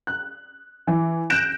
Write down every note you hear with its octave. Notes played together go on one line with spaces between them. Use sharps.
F#6
E3
F#6 G6 A#6 D7 E7